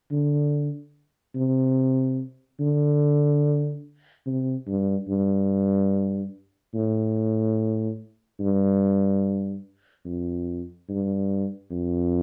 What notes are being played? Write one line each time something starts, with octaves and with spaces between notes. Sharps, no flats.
D3
C3
D3
C3
G2
G2
A2
G2
F2
G2
F2